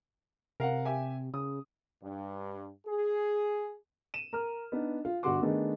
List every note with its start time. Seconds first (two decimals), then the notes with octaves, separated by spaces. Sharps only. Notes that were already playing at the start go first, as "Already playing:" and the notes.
0.60 C3 A#4 F5 F#5
0.85 G4 E5 G#5
1.34 C#3 D#6
2.03 G2
2.87 G#4
4.14 D#7 E7
4.33 A#4 A#5 F6
4.72 B3 D4 D#4
5.05 F4
5.23 G1 G2 F#4 F#5 C6 D6
5.42 D#3 A3 B3 D4 D#4 G#4